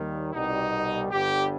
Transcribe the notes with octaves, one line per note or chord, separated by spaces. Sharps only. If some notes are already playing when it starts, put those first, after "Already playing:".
Already playing: D#2 D#3 G3
C2 B2 G3 D#4
G1 G2 D3 G3 G4